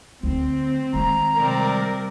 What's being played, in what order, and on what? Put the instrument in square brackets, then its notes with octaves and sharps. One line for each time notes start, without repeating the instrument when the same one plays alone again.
[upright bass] D2 [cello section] C4
[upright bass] D#3 G#3 [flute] A#5
[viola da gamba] C3 C4 D5 [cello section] G3 A#4